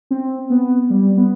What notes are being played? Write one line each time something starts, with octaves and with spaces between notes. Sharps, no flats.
C4
B3
G3
B3